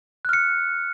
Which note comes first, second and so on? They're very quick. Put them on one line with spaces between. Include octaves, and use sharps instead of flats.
F#6 F6 C#7